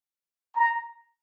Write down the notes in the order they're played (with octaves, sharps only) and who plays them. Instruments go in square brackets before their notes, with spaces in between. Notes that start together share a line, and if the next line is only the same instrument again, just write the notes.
[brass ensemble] A#5